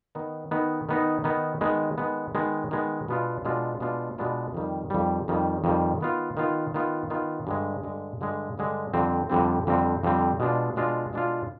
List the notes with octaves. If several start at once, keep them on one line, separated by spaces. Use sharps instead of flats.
D#3 B3 D#4
D#3 B3 D#4
D#3 B3 D#4
D#3 B3 D#4
D#3 G#3 B3
D#3 G#3 B3
D#3 G#3 B3
D#3 G#3 B3
B2 G#3 B3 D4 F4
B2 G#3 B3 D4 F4
B2 G#3 B3 D4 F4
B2 G#3 B3 D4 F4
F2 D#3 G3
F2 D#3 G3
F2 D#3 G3
F2 D#3 G3
D#3 B3 F4
D#3 B3 F4
D#3 B3 F4
D#3 B3 F4
G2 D3 G#3
G2 D3 G#3
G2 D3 G#3
G2 D3 G#3
F2 D3 G3 C4
F2 D3 G3 C4
F2 D3 G3 C4
F2 D3 G3 C4
B2 G#3 D4 F4
B2 G#3 D4 F4
B2 G#3 D4 F4